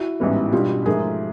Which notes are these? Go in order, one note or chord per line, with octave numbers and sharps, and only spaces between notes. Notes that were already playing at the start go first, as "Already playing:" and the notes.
Already playing: E4 F#4
A1 G#2 E3 G3 B3
B2 G3 B3 D4 F4 G4
G#2 F3 A3 G#4 A#4